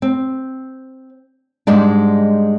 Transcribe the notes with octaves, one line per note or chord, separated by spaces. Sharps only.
C4
G#2 G3 G#3 D4